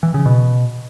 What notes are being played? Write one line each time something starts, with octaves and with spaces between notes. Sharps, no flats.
E3
C#3
B2